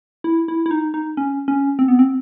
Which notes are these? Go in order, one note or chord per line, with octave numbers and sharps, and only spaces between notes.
E4
E4
E4
D#4
D#4
C#4
C#4
C4
B3
C4